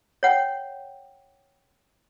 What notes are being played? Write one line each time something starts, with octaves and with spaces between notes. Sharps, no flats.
C#5 F#5 G5